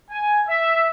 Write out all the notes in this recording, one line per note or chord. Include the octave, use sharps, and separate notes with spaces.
G#5
E5